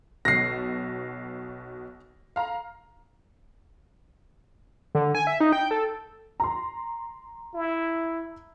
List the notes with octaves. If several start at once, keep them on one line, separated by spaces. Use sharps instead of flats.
B1 B2 A#6 C7
F5 A#5
D3
G#5
E5
D#4
G5
A4
A#5 C6
E4